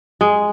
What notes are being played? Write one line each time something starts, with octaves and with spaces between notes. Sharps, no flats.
G#3